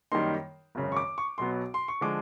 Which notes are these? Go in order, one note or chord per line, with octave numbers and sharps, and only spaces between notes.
F#2 D#3 G3 A#3 D#4 C6
G#1 F#2 C#3
C#6
D6
C#6
B1 B2 F#3 B3 C6
C6
C#6
D3 F3 G#3 D6